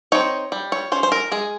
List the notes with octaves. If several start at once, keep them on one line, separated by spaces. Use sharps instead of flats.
C4 D#4 C#5
G3
C#5
C#4 C5
C5
A#4
G#3 G#4